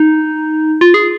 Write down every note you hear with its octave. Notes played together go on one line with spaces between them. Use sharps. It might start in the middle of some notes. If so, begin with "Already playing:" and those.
Already playing: D#4
F4
G#4